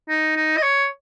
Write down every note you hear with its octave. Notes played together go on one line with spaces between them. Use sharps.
D#4
D#4
D#5
C#5